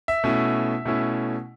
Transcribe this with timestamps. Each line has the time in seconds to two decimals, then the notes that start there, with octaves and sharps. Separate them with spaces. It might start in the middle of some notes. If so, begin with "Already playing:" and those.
0.08 E5
0.24 B2 A3 C#4 E4
0.85 B2 A3 C#4 E4